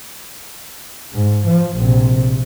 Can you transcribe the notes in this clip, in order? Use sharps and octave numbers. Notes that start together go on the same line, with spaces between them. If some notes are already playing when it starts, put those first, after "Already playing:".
G#2
F3
A#1 C3